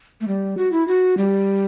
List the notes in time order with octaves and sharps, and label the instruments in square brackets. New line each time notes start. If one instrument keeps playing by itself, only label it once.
[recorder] A3
G3
F#4
E4
F#4
G3